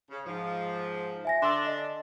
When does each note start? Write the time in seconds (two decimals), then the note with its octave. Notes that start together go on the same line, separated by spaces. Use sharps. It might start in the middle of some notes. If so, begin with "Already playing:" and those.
0.10 C#3
0.26 G#2 F3
1.25 E5 G#5 A#6
1.42 D3 D4 C6 E6
1.67 D#5